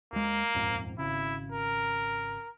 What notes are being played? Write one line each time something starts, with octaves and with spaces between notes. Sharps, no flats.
D2 G#3 A#3
D#1 F2 G#2
G#1 C#3 E4
A#4